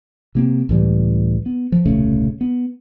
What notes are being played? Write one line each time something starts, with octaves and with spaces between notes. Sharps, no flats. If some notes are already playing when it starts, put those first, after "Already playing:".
C3 A#3 C4
C#2 A2 E3 G3
B3
F3
D#1 C2 C#3 A3
B3